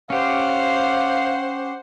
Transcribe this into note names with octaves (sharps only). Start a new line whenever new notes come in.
C#4 G4 C5 F5 F#5